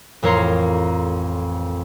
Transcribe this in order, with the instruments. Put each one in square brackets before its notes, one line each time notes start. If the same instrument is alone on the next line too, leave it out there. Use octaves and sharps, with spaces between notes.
[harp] A1 F2 A#4 C#5 A#5 C6